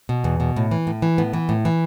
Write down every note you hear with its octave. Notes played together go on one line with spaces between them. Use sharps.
B2
E2
B2
A2
E3
A2
E3
A2 B3
E3
A2
E3